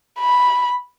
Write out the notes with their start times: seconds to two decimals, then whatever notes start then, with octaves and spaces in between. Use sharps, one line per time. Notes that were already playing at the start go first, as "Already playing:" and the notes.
0.19 B5